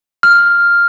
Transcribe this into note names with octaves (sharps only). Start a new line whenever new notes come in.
F6